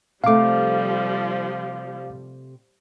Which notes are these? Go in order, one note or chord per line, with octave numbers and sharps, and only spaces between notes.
C3 F3 G3 A3 F5 D6